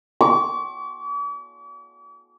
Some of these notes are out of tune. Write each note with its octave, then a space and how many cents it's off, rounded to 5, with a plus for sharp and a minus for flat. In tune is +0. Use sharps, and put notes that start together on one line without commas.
D6 -45